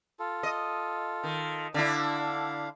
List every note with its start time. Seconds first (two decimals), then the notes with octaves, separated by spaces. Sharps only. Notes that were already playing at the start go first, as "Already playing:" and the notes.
0.20 F4 A4
0.43 D#5
1.23 D#3
1.74 D3 D4 E4 F5